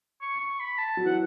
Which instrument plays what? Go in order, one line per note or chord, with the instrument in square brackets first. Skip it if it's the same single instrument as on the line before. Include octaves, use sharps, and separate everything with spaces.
[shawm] C#6
C#6
B5
A5
[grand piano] F#3
[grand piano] E3 [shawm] F#5